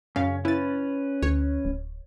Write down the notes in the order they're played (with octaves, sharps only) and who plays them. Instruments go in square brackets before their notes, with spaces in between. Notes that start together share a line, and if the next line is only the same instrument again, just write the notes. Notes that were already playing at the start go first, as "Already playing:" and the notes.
[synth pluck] F#2 C#3 F5 [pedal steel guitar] C#4
[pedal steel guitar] C#4 B4 [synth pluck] E4 A6
[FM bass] D2 [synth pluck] C#5
[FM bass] D1